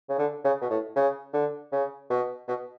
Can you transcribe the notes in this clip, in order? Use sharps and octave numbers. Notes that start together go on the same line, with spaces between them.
C#3
D3
C#3
B2
A2
C#3
D3
C#3
B2
B2